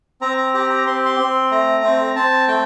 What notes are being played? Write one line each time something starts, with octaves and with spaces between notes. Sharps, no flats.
C4 A#5
A#5
G4 A#5
A#5
C4 C6
C6
C4
A3 A#5
C4
C4 A5
A3 G5